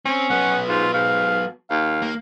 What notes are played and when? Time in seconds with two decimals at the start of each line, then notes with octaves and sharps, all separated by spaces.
0.05 C4 C#4
0.30 F#3 B3 F#5
0.69 G#2 F4
0.94 G#2 F5
1.71 D#2 F5
2.02 A#3